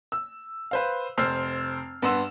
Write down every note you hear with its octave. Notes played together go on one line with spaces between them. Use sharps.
E6
B4 C5 F5
F1 C5 E6 F6 C7
G2 B3 F#5 C6 E6 E7